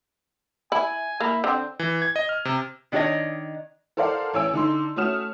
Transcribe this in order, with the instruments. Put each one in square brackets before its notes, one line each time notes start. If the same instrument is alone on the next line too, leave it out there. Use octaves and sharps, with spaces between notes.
[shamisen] E4 [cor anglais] G#5
[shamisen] A#3 [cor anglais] E4
[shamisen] D3 [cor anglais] C4
[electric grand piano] E3
G#6
D#5
F6
C3
[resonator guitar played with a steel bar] D#3 D4 F#4 A4 C#5 D#5
[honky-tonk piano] A4 A#4 C5 D5 F5 F#5
A1 C#5 G#5 E6 D7
D3 D#4 C6
A3 C#4 F#4 D#6 F6 E7